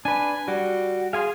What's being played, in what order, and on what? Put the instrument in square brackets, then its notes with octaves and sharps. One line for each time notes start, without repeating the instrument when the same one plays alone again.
[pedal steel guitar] D4 B4 [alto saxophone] G#5
[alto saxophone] G3 [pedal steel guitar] F#4
[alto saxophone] G#4 [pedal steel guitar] F5 G#5 C6